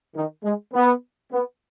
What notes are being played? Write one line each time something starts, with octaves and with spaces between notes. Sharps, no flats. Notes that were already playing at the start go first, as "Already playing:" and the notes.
D#3
G#3
B3
B3